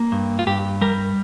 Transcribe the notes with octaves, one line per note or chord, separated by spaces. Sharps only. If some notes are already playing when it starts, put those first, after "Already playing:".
Already playing: A#3
G2
F4
G2 G4
G3 A#4